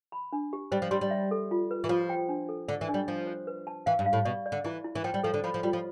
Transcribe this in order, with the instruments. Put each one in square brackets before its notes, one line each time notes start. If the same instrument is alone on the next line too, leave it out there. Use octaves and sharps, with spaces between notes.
[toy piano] B5
D4
G4
[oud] G3 [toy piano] C5
[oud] F3
[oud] G3 [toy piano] C6
[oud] G3
[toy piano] E5
A4
F4
B4
[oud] E3
[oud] F3 [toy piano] F4
[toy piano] G5
D4
A4
[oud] D3 [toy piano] D5
[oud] E3
[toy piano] D4
[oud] G3
[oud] F3 [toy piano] D4
[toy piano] C5
B4
A5
[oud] E3 [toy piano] F5
[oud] G2
[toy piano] F5
[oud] A2
[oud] B2 [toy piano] D5
[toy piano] D5
[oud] D3
[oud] E3 [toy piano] E4
[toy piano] E4
[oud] E3
[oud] F3 [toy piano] G5
[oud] G3
[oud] F3 [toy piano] A4
[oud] D3
[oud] F3 [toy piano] B5
[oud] F3
[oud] G3 [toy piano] F4
[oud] F3